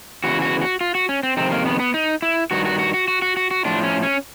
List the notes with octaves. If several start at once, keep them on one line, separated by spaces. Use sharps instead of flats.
E2 C#3 E3 F#4
F#4
F#4
F4
F#4
C#4
C4
F2 C3 D#3 C4
A#3
B3
B3
D#4
E4
G2 D#3 F#4
F#4
F#4
F#4
F#4
F#4
F#4
F#4
A2 F3 D4
C#4
C#4